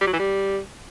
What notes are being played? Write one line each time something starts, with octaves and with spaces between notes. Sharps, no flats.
G3
F#3
E3
G3